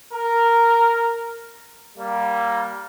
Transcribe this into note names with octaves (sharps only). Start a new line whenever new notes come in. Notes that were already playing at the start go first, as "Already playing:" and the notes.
A#4
G3 A#3